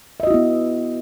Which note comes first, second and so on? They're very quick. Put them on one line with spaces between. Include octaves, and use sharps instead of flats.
E5 D#5 F#4 E4 B3